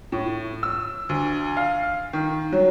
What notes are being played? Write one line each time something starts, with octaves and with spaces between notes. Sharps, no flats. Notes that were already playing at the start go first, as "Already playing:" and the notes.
A2
E6
D2
F5
D#3
F#3